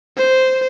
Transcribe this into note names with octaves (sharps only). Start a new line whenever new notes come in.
C5